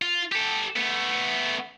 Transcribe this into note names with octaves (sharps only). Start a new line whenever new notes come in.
F4
G4 A4
A3 B3